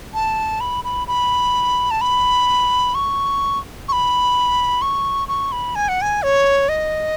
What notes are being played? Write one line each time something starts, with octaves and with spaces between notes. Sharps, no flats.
A5
B5
B5
B5
A5
B5
C#6
C#6
B5
C#6
C#6
B5
G#5
F#5
G#5
C#5
D#5